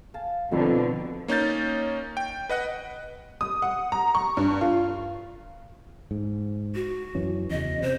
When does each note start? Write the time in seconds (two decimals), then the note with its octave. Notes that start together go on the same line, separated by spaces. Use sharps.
0.14 F5 G#5 A5
0.52 F2 B2 D3 C4 D#4 B4
1.28 A#3 C#4 D#4 G6 A6
2.17 G5
2.49 B4 D#5 F#5 F#6
3.41 D#6
3.62 F#5
3.92 A#5
4.15 C#6
4.37 G2
4.61 F4
6.11 G#2
6.75 F#4
7.15 F#2 E3 C#4
7.51 E2 C#3 D#5
7.82 C3 C5